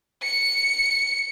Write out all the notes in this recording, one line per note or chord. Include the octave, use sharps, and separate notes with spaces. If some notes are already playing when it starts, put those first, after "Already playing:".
C#7